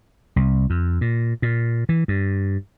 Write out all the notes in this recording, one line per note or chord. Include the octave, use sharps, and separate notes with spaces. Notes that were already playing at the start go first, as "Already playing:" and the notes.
C2
F2
A#2
A#2
E3
G2